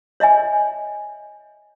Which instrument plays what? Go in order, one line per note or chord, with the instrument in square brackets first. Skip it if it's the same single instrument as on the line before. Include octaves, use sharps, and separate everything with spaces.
[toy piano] C#5 D#5 E5 G#5